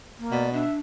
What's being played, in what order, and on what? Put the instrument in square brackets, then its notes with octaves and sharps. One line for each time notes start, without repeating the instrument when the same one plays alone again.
[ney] A#3
[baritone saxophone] B2 [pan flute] D5
[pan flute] D4 [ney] E5